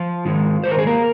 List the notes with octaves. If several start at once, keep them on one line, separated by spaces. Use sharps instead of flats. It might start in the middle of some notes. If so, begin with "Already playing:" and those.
Already playing: F3 F4
G#2 D#3 G#3
G#2 D#3 C5
A#4
G#4
A#3 A#4